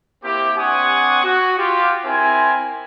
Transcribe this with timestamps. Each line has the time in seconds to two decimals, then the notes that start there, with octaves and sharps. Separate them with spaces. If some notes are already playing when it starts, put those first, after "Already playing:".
0.24 A#3 C4 E4 G4
0.58 C4 D4 F#5 G#5 C#6 D#6
1.24 F#4
1.58 F4 G4
2.05 C4 E4 A#4 C5 G#5